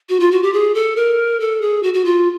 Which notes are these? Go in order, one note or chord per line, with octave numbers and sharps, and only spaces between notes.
F#4
F4
F#4
G4
G#4
A4
A#4
A4
G#4
F#4
F#4
F4